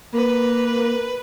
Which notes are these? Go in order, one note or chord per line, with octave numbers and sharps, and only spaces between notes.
A#3 B4